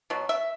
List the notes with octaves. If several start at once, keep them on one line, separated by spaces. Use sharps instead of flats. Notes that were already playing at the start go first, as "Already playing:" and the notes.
B2 F#3
E5